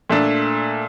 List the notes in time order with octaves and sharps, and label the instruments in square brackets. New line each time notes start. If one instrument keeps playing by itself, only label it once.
[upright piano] A#2 A3 D4